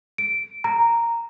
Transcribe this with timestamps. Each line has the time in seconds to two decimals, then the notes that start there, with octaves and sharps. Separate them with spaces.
0.18 D7
0.64 A#5